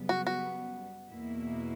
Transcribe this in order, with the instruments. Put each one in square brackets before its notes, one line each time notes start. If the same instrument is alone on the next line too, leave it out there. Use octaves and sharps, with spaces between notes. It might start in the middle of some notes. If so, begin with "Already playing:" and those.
Already playing: [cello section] F#2 C#3 G3 B3
[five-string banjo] F#4
F#4
[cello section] E2 B2 A#3 E4